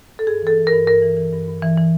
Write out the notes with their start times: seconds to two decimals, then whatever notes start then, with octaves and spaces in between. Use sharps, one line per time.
0.19 A4
0.27 G2 G#4
0.42 E3 A4
0.58 E3
0.67 A#4
0.73 G2
0.87 G2 A#4
1.03 E3
1.17 E3
1.32 G2
1.48 G2
1.62 E3
1.78 E3